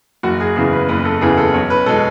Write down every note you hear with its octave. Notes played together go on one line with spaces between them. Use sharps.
F#1 F#4
G#4
E2 C#3 E3 G#4
B4
F#1 B4
A4
E2 C#3 E3 G#4
A4
B1 C#5
B4
B2 G#3 A4